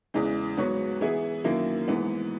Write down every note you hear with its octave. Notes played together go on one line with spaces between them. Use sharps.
E2 C#3 E3 G#3
G#2 F#3 B3 F#4 C#5
E3 B3 E4 G#4
F#2 D#3 F#3 A#3 E4
G#2 E3 B3